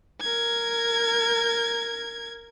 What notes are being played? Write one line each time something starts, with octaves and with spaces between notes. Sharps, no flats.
A#4 G#6